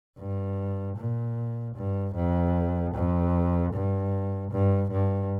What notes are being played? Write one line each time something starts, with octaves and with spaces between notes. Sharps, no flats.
G2
A#2
G2
F2
F2
G2
G2
G2